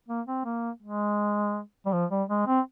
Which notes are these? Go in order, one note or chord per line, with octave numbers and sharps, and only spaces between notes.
A#3
C4
A#3
G#3
G3
F3
G3
G#3
C4